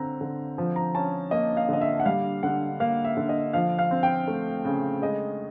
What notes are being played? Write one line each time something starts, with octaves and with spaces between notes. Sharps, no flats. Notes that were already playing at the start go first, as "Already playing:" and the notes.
Already playing: D3 C4 A#5
D3
F3
A#5
C#4 A5
A#3 D#5
F5
D3 D#5
E5
F#5
G3 F5
D3 F#5
A#3 F5
E5
D3
D#5
F3 F5
F5
C4
G5
A3
C#3
G#3 D#5